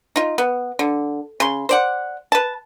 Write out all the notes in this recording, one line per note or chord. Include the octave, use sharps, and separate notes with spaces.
D#4 F4
B3
D3
C#3 C6
C5 D5 F#5
B4 A5